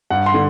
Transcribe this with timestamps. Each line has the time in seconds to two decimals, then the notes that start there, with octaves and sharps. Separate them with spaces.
0.10 G2 F#5
0.26 C6
0.34 D3